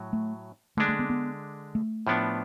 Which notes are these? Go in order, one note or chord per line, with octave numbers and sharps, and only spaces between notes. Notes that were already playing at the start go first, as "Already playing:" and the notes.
Already playing: A2 F#3
A3
D3 G#3 A3 D4
A3
B3
B3
A3
A2 F3 B3 D4